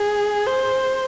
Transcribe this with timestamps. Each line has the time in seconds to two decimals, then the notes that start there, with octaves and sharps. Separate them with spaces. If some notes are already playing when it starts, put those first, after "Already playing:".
Already playing: G#4
0.47 C5